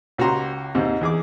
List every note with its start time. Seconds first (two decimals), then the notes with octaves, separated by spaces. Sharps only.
0.18 C#2 F#4 G4 A#5 C6
0.75 D#2 G#2 C3
1.01 E2 G#4 D6